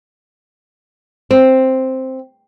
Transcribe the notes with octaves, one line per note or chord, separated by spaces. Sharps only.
C4